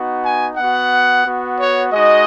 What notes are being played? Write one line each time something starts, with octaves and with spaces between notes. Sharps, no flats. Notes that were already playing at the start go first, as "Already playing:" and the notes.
Already playing: B3 D#4 F#4
G#5
B3 F#4 F#5
B3 F#4
C#5
G#3 D#4 F#4 D#5